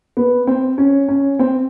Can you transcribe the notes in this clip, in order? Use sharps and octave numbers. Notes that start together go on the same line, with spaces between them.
B3
C4
C#4
C#4
C4